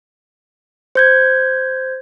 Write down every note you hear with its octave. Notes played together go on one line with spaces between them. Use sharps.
C5 G6 G#6